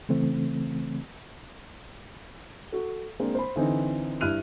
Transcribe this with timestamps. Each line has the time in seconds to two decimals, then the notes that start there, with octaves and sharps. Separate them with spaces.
0.09 C#3 E3 A3 C4
2.72 F#4 A4
3.20 G#3 A#3 C4 D4 G#4
3.35 C5 B5
3.56 D3 E3 C4 D#4
4.21 G2 E4 F6 F#6 D#7 F7